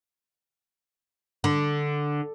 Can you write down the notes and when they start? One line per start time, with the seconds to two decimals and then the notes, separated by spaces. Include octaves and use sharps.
1.44 D3